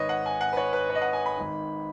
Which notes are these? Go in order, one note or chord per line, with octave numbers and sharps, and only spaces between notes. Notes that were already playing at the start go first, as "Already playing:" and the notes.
Already playing: G#1 G#2 D#3 B4 C#5 D#5
F#5
G#5
F#5
B4
C#5
B4
C#5
D#5
F#5
G#5
B5
G#1 G#2 D#3